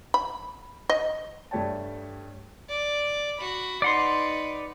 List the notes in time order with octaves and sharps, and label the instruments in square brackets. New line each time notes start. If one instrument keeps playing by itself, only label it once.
[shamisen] B5
D#5
[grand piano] G2 G3 A3 C#5 G5 A5
[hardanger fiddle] D5
F#4 B5
[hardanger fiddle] D#4 B4 [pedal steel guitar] D5 F#5 C6